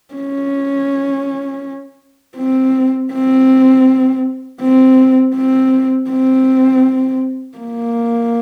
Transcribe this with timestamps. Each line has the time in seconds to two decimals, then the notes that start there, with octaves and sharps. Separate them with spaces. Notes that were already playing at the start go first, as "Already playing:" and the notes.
0.14 C#4
2.37 C4
3.12 C4
4.61 C4
5.35 C4
6.10 C4
7.58 A#3